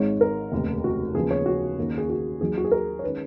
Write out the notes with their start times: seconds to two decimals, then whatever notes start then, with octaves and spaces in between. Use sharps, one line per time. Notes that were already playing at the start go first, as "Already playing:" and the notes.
Already playing: G#1 G#2 D#3 G#3 C#5
0.21 A#4
0.52 F1 D#2 C#3
0.84 F#4
1.15 D#2 C#3 F3 B3 G#4
1.31 C#5
1.46 F#4
1.78 D#2 D#3 A#3 C#4
1.98 G#4
2.09 F#4
2.41 D#2 D#3 F#3 G#4
2.57 F#4
2.65 G#4
2.71 A#4
2.99 C#5
3.04 D#3 G#3 C#4 B4